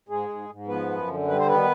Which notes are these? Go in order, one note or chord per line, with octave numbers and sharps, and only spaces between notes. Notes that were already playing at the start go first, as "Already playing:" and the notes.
G#2 G#3 G#4
G#2
G#2
F3 B3 B4
F#2
D3
G3 B4
C5
D#3 B3 B4